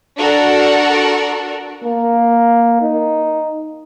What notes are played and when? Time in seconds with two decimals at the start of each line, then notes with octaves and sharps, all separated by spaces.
0.16 D4 F#4 A4 A#4
1.84 A#3
2.82 D#4